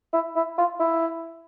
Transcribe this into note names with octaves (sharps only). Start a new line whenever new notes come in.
E4
E4
F4
E4